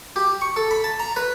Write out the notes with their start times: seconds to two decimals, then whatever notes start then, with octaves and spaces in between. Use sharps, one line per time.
0.16 G4
0.41 C#6
0.56 A4
0.71 B5
0.84 A5
1.00 A#5
1.16 B4